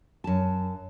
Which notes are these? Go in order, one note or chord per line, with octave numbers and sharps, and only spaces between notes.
F#2 A5